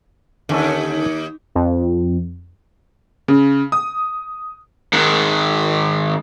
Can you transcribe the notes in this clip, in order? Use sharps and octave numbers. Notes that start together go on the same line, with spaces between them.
D#2 D3 C#4 A4
F2
C#3
D#6
G#2 D#3